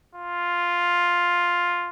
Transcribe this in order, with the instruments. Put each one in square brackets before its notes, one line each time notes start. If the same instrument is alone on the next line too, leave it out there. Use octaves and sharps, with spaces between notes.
[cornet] F4